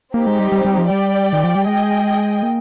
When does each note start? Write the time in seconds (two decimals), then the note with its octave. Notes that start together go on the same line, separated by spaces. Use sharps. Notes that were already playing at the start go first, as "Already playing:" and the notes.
0.14 A#3 C4 D#4 G4
0.27 G#3
0.39 G3
0.52 G3
0.65 G3
0.78 F3
0.90 G3 G4 D5 G5
1.33 D#3
1.43 F3
1.55 G3
1.66 G#3 G#4 D#5 G5
2.43 A#3